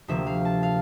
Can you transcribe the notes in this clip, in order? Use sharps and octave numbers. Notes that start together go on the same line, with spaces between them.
D2 C3 F3 A#3 E5
F5
A5
F5